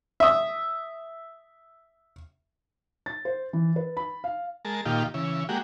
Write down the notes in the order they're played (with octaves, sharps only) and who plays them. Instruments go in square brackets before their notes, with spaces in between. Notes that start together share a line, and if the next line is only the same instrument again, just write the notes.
[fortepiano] E5 D#6
[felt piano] A6
C5
E3
B4
B5
F5
[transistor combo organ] G#3 A#4 A5
A#2 D#3 F4 G4
C#3 E3
G#3 A#3 F#4 G4